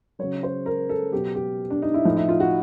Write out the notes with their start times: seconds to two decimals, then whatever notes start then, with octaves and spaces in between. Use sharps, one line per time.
0.19 C#3 F#3 C#5
0.43 C5
0.66 A#4
0.89 A4
1.12 B2 F#3 G4
1.35 G4
1.70 D4
1.82 D#4
1.94 E4
2.05 A2 F3 D#4
2.16 E4
2.29 F4
2.40 F#4